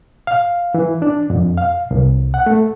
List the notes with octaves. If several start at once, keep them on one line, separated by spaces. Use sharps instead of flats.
F5
E3
D4
F2
F5
C2
F#5
A3